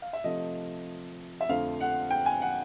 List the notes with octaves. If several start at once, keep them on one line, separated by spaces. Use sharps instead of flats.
F5
E5
C3 F3 A3 D#5
E5
F2 D3 F3 A3 F5
F#5
G5
G#5
F#5